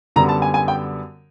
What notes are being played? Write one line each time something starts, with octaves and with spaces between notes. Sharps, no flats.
F#2 D3 G3 B3 A#5
A5
G#5
G#5
G5